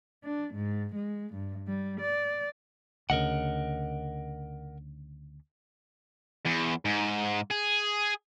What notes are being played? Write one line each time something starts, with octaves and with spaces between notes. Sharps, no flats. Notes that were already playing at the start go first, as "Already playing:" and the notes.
D4
G#2
G#3
G2
G3
D5
D2 C#3 A#4 D#5 F#5
E2
G#2
G#4